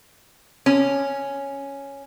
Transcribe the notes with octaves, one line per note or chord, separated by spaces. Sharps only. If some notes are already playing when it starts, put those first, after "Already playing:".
C#4